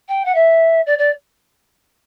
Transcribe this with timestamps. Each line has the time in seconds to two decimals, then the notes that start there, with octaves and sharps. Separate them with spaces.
0.09 G5
0.25 F#5
0.35 E5
0.86 D5
0.98 D5